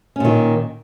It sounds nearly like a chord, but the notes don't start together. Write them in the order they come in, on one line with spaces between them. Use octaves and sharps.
C#4 A#2 D#3